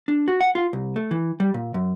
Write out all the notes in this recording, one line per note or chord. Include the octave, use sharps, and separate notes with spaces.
D4
F#4
F#5
F4
C2
A3
E3
G3
A#2
F#2